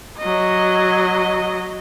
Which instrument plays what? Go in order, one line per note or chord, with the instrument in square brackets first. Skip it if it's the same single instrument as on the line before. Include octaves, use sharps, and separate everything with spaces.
[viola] F#3 D#5